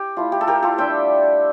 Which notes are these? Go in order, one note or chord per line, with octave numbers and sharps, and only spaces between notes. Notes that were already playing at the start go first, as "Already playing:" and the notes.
Already playing: G4
A3 E4 F4
G4
A4
G4 A#4
F4 A4
G3 D4 F4 E5 G5